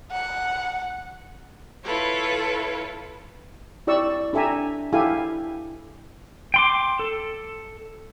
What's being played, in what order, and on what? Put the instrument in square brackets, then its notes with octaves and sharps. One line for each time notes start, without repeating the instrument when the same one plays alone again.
[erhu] F#5
[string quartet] E4 F4 A4 B4 C#5
[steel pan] E4 G4 D5 C#6 E6
D4 G4 A4 E5 G#5 A#5
E4 G4 A4 F5 G#5
[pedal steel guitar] G5 C6 D6
A4